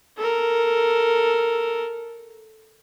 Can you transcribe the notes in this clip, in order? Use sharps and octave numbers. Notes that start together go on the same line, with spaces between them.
A4 A#4